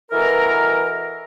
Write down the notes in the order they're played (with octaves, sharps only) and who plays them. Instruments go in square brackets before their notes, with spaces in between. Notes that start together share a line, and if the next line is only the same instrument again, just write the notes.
[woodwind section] B2 E3 A4 A#4